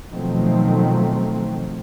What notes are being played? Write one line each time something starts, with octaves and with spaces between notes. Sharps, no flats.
B2 D#3 F3 F#3 A3 C4